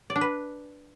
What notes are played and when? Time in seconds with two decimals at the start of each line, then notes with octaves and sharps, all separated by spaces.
0.10 D5
0.16 D4
0.21 B4